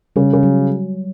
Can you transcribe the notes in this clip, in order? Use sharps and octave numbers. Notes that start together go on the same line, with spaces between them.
C#3 G3
C#3 G3
F#3